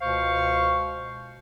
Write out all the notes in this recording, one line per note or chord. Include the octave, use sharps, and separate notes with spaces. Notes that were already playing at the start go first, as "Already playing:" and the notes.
C#2 B2 C5 F5 C#6